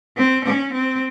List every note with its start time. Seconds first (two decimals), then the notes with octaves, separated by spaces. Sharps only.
0.17 C4
0.45 C#4
0.73 C4